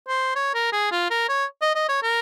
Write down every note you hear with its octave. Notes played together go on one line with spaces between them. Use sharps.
C5
C#5
A#4
G#4
F4
A#4
C#5
D#5
D#5
C#5
A#4